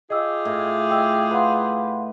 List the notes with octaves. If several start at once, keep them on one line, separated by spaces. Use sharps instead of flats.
F4 G4 G#4 D#5 E6
A2
D#5 G5 E6
B4 F5 F#5 C6